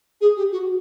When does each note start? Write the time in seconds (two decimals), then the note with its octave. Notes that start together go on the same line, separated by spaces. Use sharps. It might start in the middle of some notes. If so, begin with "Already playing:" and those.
0.21 G#4
0.37 G4
0.52 F#4